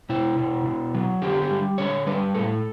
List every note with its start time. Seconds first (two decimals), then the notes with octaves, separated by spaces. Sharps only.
0.09 B2 E4
0.38 B2
0.66 B2
0.95 F#3
1.22 D3 G4
1.41 G4
1.51 G3
1.78 D3 C#5
2.07 G3 B4
2.34 A2 A4